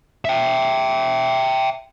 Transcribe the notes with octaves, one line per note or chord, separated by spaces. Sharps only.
E5 G5